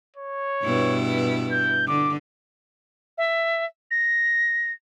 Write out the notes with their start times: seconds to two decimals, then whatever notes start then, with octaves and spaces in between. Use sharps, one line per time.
0.16 C#5
0.64 G2 B2 E4
1.52 G6
1.88 D3 D6
3.18 E5
3.91 A#6